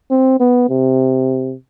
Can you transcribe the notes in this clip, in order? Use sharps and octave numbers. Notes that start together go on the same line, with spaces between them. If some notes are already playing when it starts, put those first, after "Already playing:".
C4
B3
C3